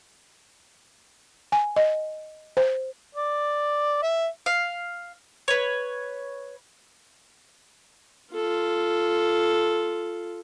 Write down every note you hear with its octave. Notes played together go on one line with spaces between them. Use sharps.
G#5
D#5
C5
D5
E5
F5
B4 C#5
F4 A4